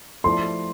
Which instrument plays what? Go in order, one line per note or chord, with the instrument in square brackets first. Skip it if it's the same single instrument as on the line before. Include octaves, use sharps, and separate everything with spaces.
[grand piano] F3 A3 E4 A4 D5 [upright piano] C6